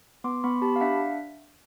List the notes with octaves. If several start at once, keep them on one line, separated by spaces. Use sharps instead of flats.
B3 C6 D6
B3 B5 C#6
G4 A5 B5
F5
D4 E5 F#5